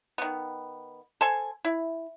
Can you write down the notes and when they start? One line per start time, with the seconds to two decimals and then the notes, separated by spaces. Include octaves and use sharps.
0.18 D#3 B3
1.21 A4 C5 G#5
1.65 E4